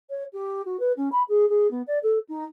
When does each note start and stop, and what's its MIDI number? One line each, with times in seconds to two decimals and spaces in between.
0.10 0.24 73
0.33 0.64 67
0.65 0.77 66
0.80 0.92 71
0.96 1.09 61
1.12 1.23 83
1.28 1.48 68
1.49 1.69 68
1.70 1.82 59
1.87 1.98 74
2.03 2.18 69
2.28 2.44 63